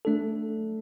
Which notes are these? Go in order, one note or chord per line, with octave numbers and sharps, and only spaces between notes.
A3 D4 A4